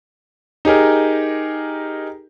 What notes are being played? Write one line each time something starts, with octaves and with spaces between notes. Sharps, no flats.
D#4 G4 G#4 A#4